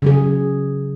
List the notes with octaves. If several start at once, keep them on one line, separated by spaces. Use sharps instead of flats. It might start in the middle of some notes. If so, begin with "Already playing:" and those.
C#3 F#3 G#4